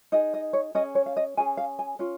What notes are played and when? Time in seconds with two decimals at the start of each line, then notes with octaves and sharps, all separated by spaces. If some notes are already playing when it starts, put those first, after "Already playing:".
0.12 D#4 G#4 D#5
0.34 D#5
0.53 C#5
0.75 C#4 G#4 D#5
0.95 C#5
1.06 F5
1.17 D#5
1.37 C#4 G#4 G#5
1.57 F5
1.79 G#5
1.99 C#4 F4